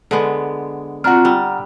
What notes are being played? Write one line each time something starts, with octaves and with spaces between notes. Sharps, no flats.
D3 G#3 B3
C4 D4 F4 F#4 F#5 A#5 F6
G3 E6